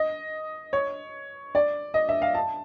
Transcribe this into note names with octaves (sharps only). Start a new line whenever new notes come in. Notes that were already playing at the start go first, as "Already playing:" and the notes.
Already playing: D#5
C#5
D5
D#5
E5
F5
A5